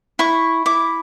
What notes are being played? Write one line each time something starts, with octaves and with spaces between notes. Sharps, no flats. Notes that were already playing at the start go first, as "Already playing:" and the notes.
E4 C#6
E4 D6